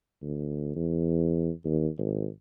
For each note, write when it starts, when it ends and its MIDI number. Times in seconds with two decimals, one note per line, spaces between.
0.22 0.75 38
0.76 1.51 40
1.65 1.88 39
1.98 2.28 32